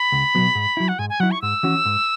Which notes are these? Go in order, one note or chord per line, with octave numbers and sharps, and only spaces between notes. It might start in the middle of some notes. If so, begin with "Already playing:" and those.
Already playing: B5
C#2
B2 F#3 B3
G#2
F#3 E4
F#5
G#2 G#5
G#5
F#3 E4 F#5
C#6
G#2 E6
E3 C#4 F#4
G#2